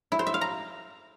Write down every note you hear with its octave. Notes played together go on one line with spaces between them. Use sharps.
E4
C5
E5
F5
A#5